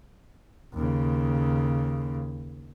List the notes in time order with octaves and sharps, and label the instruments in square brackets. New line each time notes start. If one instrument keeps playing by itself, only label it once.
[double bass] D#2 C#3